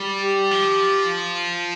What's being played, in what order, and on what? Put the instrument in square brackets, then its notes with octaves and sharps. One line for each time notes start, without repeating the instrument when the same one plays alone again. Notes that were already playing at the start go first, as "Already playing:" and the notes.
Already playing: [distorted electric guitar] G3
[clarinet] G4
[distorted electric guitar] F3